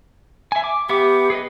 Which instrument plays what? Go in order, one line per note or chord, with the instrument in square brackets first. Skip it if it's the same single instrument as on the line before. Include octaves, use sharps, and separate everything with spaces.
[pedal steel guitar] E5 G#5
D6
[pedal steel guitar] B3 E5 D6 [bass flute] G4
[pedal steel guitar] G#4 B4 D#5